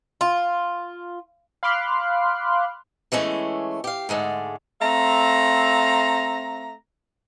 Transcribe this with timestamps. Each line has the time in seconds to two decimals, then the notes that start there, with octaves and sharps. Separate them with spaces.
0.21 F4
1.63 F5 B5 C6 D6 F6 F#6
3.12 E3 G#3 A3 C#4
3.84 G4 F5
4.09 G#2 D3 G#3 A3
4.82 A3 C4 F5 A#5